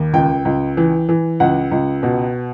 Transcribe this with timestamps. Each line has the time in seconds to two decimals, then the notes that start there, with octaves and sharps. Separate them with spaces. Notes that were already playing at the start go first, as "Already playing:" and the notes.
Already playing: D#2
0.13 C#2 G5
0.45 C#2
0.77 E3
1.09 E3
1.40 C#2 F#5
1.72 C#2
2.03 B2